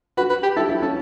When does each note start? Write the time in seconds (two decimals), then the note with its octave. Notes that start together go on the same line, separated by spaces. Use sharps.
0.17 F#4 B4
0.30 B4
0.43 G4
0.56 E4 A4
0.69 E4
0.82 C#4 A4